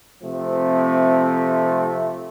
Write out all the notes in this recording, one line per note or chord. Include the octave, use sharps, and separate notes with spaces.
C3 F3 A3 C4